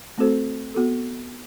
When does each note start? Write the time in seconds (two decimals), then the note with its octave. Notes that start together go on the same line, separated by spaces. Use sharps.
0.18 A3 C4 F#4 A4 C5
0.74 B3 F#4 A4